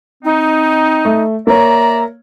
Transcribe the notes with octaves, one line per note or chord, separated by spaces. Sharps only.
C4 D#4
A3
A#3 C#5 D5 E5 A#5